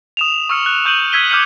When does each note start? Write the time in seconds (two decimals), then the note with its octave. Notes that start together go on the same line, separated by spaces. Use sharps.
0.17 D#6 E7 F7
0.49 C#6 E6 F6 C#7
0.66 F#6
0.85 C#6 G6 D#7 E7 F#7
1.12 E6 G#6 B6 D#7 G7
1.30 D6 F6 G6 C#7 D#7